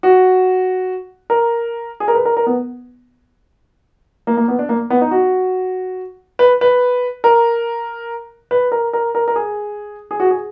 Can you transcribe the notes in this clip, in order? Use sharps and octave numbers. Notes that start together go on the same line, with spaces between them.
F#4
A#4
G#4
A#4
B4
A#4
A#4
B3
A#3
A#3
B3
D4
A#3
B3
D#4
F#4
B4
B4
A#4
B4
A#4
A#4
A#4
A#4
G#4
G#4
F#4
G#4